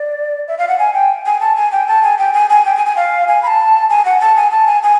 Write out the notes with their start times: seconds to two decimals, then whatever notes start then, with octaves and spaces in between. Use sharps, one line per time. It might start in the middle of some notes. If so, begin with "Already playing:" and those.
Already playing: D5
0.48 E5
0.58 F5
0.68 F#5
0.79 G#5
0.94 G5
1.26 G#5
1.41 A5
1.56 G#5
1.72 G5
1.88 A5
2.03 G#5
2.18 G5
2.34 G#5
2.50 G#5
2.65 G5
2.76 G#5
2.86 G#5
2.96 F5
3.28 G#5
3.43 B5
3.47 A5
3.90 G#5
4.05 F#5
4.21 A5
4.36 G#5
4.51 A5
4.67 G#5
4.83 G#5